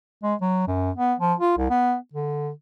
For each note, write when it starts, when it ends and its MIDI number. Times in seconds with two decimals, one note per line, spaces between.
0.23 0.35 56
0.42 0.63 54
0.68 0.91 42
0.96 1.14 59
1.19 1.34 53
1.40 1.54 65
1.58 1.67 36
1.70 1.97 59
2.13 2.50 50